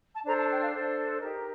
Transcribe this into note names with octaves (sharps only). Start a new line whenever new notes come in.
A5
D4 A4 C5 A#5
A5
G5
F5
D4 A4 C5
D#4 G4 A#4 D#5